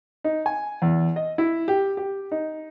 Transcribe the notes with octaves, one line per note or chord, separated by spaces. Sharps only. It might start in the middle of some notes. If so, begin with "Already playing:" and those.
D#4
G#5
E2
D#5
E4
G4
G4
D#4